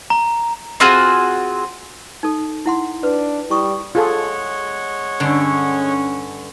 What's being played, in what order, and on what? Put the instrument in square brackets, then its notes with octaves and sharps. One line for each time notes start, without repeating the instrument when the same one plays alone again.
[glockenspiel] A#5
[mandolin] C4 F4 F#4 G#4
[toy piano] D#4 A4
E4 F#5 C6
[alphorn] D4 [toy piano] B4
[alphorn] G3 [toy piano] E4 C#6 D#6
[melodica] G#3 C#5 F#5 [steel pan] F4 G#4 A4
[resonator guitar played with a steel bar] G2 D3 [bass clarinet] C#4